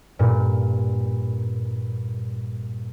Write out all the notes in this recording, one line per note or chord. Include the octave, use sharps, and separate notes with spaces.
G2 A#2